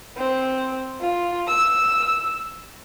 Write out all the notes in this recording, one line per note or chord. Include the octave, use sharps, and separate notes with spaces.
C4
F4
E6